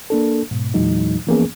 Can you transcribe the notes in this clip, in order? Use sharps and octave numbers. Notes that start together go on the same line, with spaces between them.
A#3 D4 A4
G#2 B2
E2 A#2 E3 F#3 G#3 D#4
E3 F3 A#3 B3 C#4 G#4